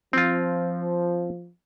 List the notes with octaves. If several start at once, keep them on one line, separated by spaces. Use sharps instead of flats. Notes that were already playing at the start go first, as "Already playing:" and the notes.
F3 C4 F4